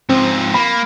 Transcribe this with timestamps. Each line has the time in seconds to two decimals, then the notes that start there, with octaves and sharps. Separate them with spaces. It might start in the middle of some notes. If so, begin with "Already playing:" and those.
0.09 G#2 F3 C4
0.54 A#3 B5